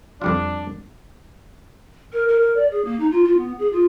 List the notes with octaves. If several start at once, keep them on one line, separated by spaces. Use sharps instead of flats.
F2 G3 D4 F4
A#4
A#4
A#4
D5
G#4
A#3
D#4
F4
F4
B3
G#4
F4